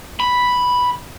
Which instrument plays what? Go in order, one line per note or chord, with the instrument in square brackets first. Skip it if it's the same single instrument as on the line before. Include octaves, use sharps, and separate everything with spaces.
[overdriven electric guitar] B5